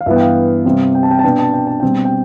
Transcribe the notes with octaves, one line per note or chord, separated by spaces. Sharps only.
F5
G2 E3 B3 E5
G5
F5
C3 G3 C4
G5
A5
G5
A5
B2 B3 D4 G5
A5
G5
A5
B2 G3 C4 G5
G5